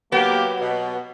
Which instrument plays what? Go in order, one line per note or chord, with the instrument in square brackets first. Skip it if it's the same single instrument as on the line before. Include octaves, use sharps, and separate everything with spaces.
[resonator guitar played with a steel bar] F#3 B3 [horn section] A#3 G4
[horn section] B2